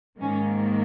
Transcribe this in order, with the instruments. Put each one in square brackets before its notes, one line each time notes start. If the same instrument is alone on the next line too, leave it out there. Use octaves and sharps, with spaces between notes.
[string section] G#2 D#3 A#3 C#4